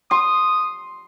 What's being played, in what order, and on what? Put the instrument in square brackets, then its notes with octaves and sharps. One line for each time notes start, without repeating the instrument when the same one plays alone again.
[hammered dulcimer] C6 [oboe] D#6